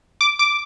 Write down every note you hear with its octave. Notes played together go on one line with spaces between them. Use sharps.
D6
D6